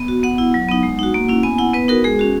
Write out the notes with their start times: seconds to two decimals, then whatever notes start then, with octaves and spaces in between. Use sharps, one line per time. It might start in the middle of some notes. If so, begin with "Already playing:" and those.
Already playing: B3
0.08 F#4
0.23 B3 F#5
0.38 E4
0.54 F#3
0.69 B3 D#4
0.83 G#3
0.99 D#4 F#4
1.14 A#3
1.28 C#4 E4
1.43 B3 G#5
1.58 E4 F#5
1.73 B3 B4
1.88 D#4 F#4 A#4
2.04 G#3 G#4
2.19 C#4 F#4